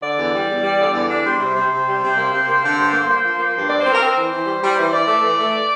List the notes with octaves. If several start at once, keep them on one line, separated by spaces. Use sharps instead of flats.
D3 D5
E2
G3
E2
G3
D3
E2
D4
G3 C5
C3
C3
C3
G3
C3
A#3
C3
A#3
D3
G2
A#3
A#3
F3
A#3
G2
C4 D5
C4 C5
A#4
C4 C5
E3
E3
G3
G3
E3
E3 D5
A3
E3
A3